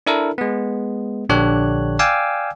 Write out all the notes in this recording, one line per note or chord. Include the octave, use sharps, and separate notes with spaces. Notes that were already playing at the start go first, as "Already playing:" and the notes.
D4 E4 A4 A#4
G#3 B3
A#1 D3 D4 G4 C#5 F#6
D5 F5 G5 G#5 D6 E6